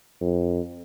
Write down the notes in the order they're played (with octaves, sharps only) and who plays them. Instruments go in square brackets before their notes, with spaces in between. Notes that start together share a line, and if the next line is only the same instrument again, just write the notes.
[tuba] F2